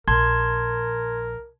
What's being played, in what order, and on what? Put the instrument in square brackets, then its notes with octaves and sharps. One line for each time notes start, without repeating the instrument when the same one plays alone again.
[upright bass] A#1 [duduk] A#4 [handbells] A5 C6 G#6